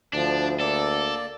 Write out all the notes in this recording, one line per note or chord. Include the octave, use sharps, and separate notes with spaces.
D2 F3 D4
A#3 A4 D5